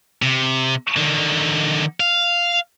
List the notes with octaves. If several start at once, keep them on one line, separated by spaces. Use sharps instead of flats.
C3
D3 D#3
F5